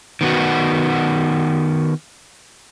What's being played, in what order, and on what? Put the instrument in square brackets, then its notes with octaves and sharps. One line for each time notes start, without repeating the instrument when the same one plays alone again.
[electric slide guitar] D#3 B3 F#4